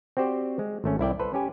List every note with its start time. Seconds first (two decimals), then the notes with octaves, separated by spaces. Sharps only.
0.17 C4 F#4 G4 C5 D5
0.59 G#3
0.84 G#1 A3 C#4
0.99 C2 E4 D5 G5
1.20 A4 B4 C5
1.34 C#4 G4 G#5